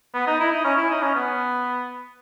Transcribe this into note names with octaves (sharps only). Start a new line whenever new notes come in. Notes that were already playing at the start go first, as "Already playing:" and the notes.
B3
D#4
E4
D#4
C#4
E4
D#4
C#4
B3